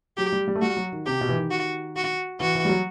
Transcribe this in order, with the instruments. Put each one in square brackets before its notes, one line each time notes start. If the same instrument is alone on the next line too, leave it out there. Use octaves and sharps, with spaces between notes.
[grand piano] F#3 [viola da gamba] G4
[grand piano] G3
G3
A3
[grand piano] G3 [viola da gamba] F#4
[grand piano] F#3
D#3
[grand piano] C3 [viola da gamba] G4
[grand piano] B2
E3
D#3
[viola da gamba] F#4
F#4
[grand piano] E3 [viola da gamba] F#4
[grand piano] E3
G3
F#3